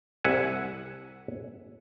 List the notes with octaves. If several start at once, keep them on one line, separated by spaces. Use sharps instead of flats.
C2 E5 F#5 G#5